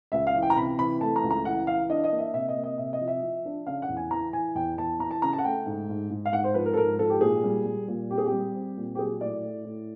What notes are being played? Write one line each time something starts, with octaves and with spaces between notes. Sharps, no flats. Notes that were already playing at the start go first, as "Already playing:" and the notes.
C#2 E5
F5
E3
G5
A#5
C3 B5
E3 B5
A3 A5
A#5
C#2
A#5
E3 F#5
E3 F5
D4 D#5
D#5
A#3
E5
C3 E5
D#5
A#3
D#5
C3 E5
D#5
F3
E5
F3
D4
C#3 F5
F#5
E2
G#5
E3 A#5
E3 G#5
E2 G5
E2 A5
E3 A#5
A5
C#3 A#5
A5
F#5
A3 G5
G#2
G#2
G#2
F5
G#2 F#5
C5
F3 B4
A#4
A4
G#2 A#4
F3 A4
G4
A#2 G#4
G3
G3
A#2
C4 G4
G#4
G4
G3
C4
A#2
G4
F#3 G#4
A2 D5
A2
A2